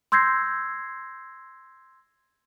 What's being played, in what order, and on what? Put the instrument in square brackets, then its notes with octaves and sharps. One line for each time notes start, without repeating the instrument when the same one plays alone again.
[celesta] C6 E6 G6 G#6 A#6 C7